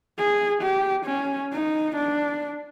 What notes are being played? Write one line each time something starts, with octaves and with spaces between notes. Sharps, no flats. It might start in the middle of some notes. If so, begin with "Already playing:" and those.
G#4
G4
C#4
D#4
D4